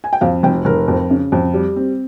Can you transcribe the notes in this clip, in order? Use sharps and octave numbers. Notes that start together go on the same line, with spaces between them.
G#5
G5
F2 F5
F1 G5
F1 A#4
F2
C#3
F2
G3
C4